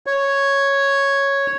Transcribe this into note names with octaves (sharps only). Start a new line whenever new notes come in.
C#5